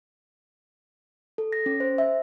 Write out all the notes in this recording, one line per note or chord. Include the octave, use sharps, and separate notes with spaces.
A4
A#6
C#4
C5
E5